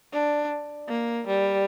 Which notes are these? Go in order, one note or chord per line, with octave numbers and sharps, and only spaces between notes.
D4
A#3
G3